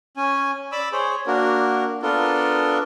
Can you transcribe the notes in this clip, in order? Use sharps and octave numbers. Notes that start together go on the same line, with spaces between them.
C#4 G#5
D5 B5 D6 E6
G#4 C5 C#5
A#3 D4 F#4 A#4
B3 D4 F4 A4 A#4